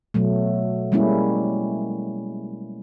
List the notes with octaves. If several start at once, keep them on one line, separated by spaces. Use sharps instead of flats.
B2 F#3 A3
G3 G#3 A#3 C#4 E4